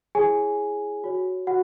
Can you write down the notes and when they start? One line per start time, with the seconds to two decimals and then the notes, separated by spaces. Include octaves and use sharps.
0.15 E4 G#4 C#5 G#5
1.04 F#4 C#5
1.47 F#4 F#5